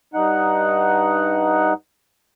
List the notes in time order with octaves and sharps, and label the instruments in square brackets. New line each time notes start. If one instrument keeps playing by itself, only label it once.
[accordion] G2 D#4 F#5